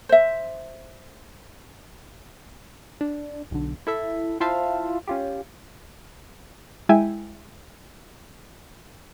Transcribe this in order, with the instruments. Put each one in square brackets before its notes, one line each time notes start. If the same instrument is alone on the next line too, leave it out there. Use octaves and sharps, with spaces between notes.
[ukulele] C5 E5
[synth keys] D4
B1 D3
E4 A4 E5
E4 F4 C5 E5 F5 A5
C#4 F4 G4
[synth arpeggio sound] G#3 E4 E5 G5 G#5